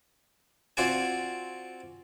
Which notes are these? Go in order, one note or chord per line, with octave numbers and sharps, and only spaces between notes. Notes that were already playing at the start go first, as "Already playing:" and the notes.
C4 F4 F#4 D5 G#5